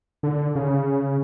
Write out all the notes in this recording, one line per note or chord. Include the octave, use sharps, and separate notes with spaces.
D3
C#3